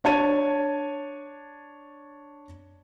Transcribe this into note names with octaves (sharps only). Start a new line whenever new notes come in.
D4 C#5 A5 G#6 D#7